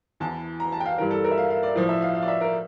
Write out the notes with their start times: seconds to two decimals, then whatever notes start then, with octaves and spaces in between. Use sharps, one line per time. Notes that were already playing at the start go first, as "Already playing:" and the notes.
0.20 E2 E3 A5
0.60 A#5
0.72 A5
0.80 G5
0.86 F5
0.98 G2 E3 A#4
1.11 A4
1.24 A#4
1.31 E5
1.38 F5
1.50 F5
1.63 D5
1.75 A2 F3 D5
1.89 E5
2.02 F5
2.15 F5
2.22 D5
2.28 E5
2.41 A#4